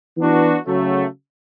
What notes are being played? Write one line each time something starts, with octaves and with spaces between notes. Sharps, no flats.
E3 B3 D4 F#4
C#3 F#3 A3